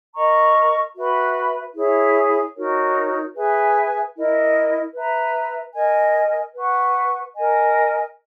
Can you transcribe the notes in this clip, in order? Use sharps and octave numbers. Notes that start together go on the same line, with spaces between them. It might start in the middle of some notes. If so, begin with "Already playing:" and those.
A#4 D#5 A#5 C#6
F#4 B4 E5 B5
E4 G#4 C#5 E5
D#4 F#4 A#4 C#5
G#4 B4 E5 G#5
E4 A#4 D#5
B4 E5 A#5
A#4 D#5 G#5
B4 F#5 C#6
A#4 D#5 G#5